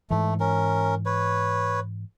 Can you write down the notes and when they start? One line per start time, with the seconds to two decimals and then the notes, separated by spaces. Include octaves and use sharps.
0.10 G#2 E3 A3
0.40 C#4 A#4
1.06 B4 C#5